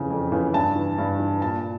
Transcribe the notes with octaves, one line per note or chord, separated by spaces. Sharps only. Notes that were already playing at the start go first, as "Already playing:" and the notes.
Already playing: F2 C#3 E3
F2
C#3 E3
G2 A5
E3
G2
E3
A#2 A5